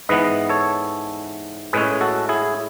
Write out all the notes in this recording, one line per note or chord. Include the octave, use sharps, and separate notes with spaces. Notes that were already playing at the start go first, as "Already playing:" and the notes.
G#2 E3 B3 B4 D#5
A4 C#5
A2 G#3 C#4 G#4 B4
F#4 A4
E4 G#4